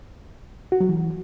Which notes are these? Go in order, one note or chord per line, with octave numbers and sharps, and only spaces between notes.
F#4
F#3
E3